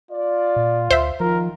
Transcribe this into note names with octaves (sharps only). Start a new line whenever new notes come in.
F4 D5
A#2
D2 C5 E5
D#3 F3 F4 A#4